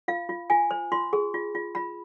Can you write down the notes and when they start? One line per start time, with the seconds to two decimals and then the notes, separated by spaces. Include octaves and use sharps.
0.08 F4 F5
0.29 F4
0.50 F4 G#5
0.71 C5
0.92 F4 C6
1.13 G#4
1.34 F4
1.55 F4
1.75 F4 B5